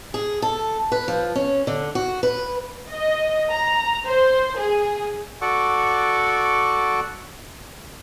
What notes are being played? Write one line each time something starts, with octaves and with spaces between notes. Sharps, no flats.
G#4
A4
B4
F3
C#4
D3
F#4
B4
D#5
A#5
C5
G#4
F#4 A4 D5 F#5 C#6 D6